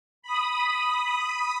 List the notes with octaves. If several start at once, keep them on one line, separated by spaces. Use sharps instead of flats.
B5 D#6